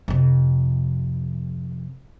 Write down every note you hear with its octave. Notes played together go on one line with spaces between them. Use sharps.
F2 C3